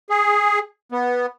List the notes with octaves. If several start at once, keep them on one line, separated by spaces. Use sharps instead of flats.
G#4
B3